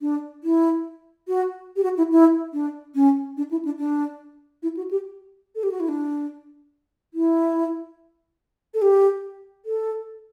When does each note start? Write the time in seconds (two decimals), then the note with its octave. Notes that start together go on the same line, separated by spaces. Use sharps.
0.01 D4
0.44 E4
1.28 F#4
1.76 G4
1.83 F#4
1.97 E4
2.11 E4
2.53 D4
2.95 C#4
3.37 D4
3.51 E4
3.65 D4
3.79 D4
4.63 E4
4.77 F#4
4.91 G4
5.55 A4
5.63 G4
5.72 F#4
5.80 E4
5.89 D4
7.14 E4
8.74 A4
8.82 G4
9.66 A4